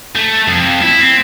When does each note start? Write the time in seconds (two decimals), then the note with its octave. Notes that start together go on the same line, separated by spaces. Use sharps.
0.15 A3
0.48 F2
0.82 E4
1.00 C4